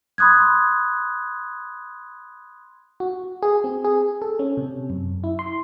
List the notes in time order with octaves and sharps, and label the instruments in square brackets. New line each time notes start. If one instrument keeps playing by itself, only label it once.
[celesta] B5 C6 D#6 F#6 G#6
[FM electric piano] F#4
G#4
C4
G#4
A4
C#4
C3
F#2
E4
C6